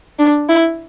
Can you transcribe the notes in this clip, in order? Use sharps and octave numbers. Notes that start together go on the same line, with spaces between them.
D4
E4